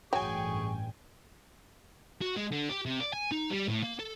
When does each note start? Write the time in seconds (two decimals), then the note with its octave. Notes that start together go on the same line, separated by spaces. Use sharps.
0.13 A1 G2 F#3 G#4 G5 G#5 C#6
2.21 F#4
2.36 G#3
2.52 D3
2.69 G4
2.86 C3
3.00 D5
3.13 G#5
3.32 D#4
3.50 G3
3.68 A2
3.84 A#3
3.99 A4